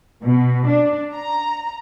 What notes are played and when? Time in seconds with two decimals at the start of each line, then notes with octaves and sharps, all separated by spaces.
0.23 B2
0.68 D4
1.16 A#5